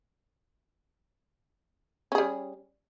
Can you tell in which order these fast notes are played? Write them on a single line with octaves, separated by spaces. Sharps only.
C#4 G#4 G3